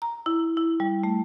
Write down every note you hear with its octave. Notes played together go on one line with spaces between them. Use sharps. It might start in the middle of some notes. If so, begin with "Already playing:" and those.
A#5
E4
E4
G3
A3